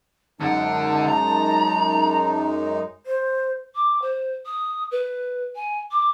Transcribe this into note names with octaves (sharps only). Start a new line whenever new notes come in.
F#2 D3 G#3 D#4 F#5 A5
A#5
C5
D6
C5
D#6
B4
G#5
D6